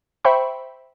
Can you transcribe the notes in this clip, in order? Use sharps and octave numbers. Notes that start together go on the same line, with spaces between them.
C5 E5 G5 B5 C#6